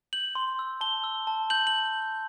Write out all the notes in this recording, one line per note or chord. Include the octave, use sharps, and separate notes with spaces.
G6 F#7
C6
E6
A5 G7
E6
A5
G6 F#7
F#7